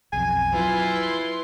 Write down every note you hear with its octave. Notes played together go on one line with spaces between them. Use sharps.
B1 F2 G#5
F#3 E4 F4 B4 C6